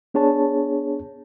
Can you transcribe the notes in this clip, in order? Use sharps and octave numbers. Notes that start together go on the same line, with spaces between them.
B3 D4 G#4 C#5 A5